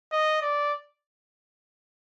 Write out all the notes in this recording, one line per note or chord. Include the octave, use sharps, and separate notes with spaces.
D#5
D5